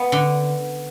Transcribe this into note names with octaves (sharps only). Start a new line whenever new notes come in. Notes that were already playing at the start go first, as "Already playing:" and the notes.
Already playing: B3
D3